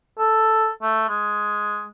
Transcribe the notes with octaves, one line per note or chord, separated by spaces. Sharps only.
A4
A3
G#3